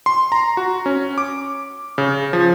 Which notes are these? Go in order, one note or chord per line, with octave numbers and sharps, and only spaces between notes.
C6
A#5
F#4
C#4
D6
C#3
F3